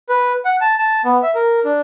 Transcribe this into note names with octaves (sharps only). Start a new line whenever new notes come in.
B4
F#5
A5
A5
B3
E5
A#4
D4